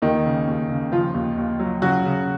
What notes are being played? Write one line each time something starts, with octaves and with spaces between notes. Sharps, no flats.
D#2 D#3 D#4
C#3
D#2
C#3
C#3 F3 F4
D#2
D#2
F#3
C#3 F#3 F#4
C#3